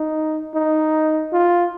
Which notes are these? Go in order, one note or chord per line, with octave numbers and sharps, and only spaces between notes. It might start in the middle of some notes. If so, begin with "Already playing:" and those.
Already playing: D#4
D#4
F4